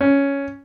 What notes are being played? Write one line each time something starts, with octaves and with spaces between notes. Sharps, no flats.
C#4